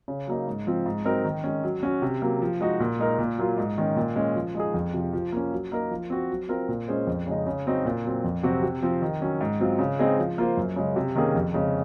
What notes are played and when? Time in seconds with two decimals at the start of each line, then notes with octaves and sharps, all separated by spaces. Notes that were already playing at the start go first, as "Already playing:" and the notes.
0.08 C#3
0.27 F#3 A#3 D#4
0.47 G#2
0.67 F3 C4
0.86 G#2
1.05 F#3 C4 D#4 A#4
1.24 D#3
1.44 G#3 C#4
1.63 F#3
1.83 C#4 F#4
2.02 C3
2.22 F#3 A#3
2.42 F3
2.61 G#3 D#4 F#4
2.80 A#2
2.99 G#3 D#4 A#4
3.19 A#2
3.38 F#3 A#3 F4
3.58 G#2
3.78 D#3 G#3 C#4
3.96 A#2
4.16 G#3 C#4
4.35 F3
4.55 G#3 D#4 G#4
4.74 F2
4.94 C3 F3
5.13 F3
5.32 A#3 C#4
5.52 F#3
5.72 A#3 D#4 A#4
5.91 F3
6.10 C4 F#4 C5
6.30 F#3
6.49 C4 F4 A#4
6.68 A#2
6.88 G#3 C#4 G#4 C5
7.07 F2
7.27 C#3 G#3 D#4
7.47 C#3
7.66 F#3 C4 D#4 F#4
7.85 A#2
8.05 F#3 C4
8.24 F2
8.43 C3 F#3 C4 F#4
8.63 C3
8.82 F3 C4
9.02 D#3
9.21 F#3 C#4
9.41 G#2
9.60 F#3 C4 F4
9.79 C#3
9.99 G#3 C4 D#4 G#4
10.18 F3
10.38 A#3 F4 C5
10.57 F#2
10.76 C#3 G#3
10.96 C3
11.15 D#3 A#3 C#4 G#4
11.35 F2
11.54 C#3 G#3 C4 D#4